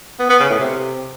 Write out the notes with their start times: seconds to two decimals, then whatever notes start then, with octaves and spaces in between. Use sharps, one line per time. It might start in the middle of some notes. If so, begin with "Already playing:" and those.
0.19 B3
0.29 B3
0.40 C#3
0.50 A2
0.60 C3